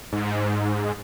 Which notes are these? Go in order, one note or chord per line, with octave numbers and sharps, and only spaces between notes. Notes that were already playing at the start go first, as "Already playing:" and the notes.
G#2